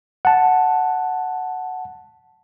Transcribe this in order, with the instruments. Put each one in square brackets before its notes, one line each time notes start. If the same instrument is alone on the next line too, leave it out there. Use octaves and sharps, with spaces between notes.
[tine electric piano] F#5 A5